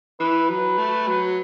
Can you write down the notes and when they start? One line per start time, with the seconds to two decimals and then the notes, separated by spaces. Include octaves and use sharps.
0.20 E3 B4
0.49 F#3 B4
0.79 A3
1.08 F#3